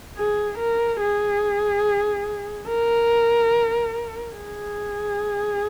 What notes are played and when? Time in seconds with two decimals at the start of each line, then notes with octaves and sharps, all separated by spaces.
0.16 G#4
0.58 A#4
1.00 G#4
2.68 A#4
4.35 G#4